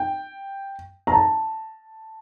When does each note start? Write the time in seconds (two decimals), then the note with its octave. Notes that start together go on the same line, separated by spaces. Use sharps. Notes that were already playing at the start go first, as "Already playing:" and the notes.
Already playing: G5
1.07 A#5
1.12 A5